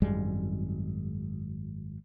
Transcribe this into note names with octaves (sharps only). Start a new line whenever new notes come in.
G#1 F#2 G3 G#3